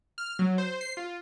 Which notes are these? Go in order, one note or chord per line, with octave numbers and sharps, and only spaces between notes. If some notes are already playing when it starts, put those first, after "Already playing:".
F6
F#3
C5
C7
F4